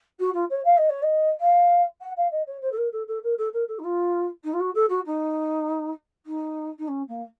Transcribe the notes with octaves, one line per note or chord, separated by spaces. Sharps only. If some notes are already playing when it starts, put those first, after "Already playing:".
F#4
F4
C#5
F5
D#5
C#5
D#5
F5
F#5
F5
D#5
C#5
C5
A4
A#4
A4
A4
A#4
A4
A#4
A4
D#4
F4
D#4
F4
F#4
A4
F#4
D#4
D#4
D#4
C#4
A#3